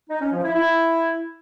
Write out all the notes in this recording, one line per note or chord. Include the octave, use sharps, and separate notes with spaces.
D#4
C#4
F3
E4
E4